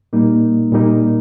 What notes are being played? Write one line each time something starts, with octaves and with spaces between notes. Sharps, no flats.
A#2 G3 A#3 D#4
A#2 G3 A#3 D#4